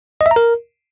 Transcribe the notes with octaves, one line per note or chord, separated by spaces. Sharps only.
D#5
E5
A#5
A#4